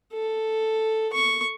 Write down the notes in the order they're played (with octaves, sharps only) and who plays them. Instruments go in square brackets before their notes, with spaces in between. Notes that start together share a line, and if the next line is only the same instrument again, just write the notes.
[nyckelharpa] A4
C#6